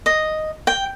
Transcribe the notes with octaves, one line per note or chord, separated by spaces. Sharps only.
D#5
G5